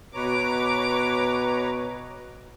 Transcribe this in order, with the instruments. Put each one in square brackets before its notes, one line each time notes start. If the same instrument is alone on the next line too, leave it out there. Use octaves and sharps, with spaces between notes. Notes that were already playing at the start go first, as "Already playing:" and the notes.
[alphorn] B2 [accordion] B4 C#5 A#5 [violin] D6 D7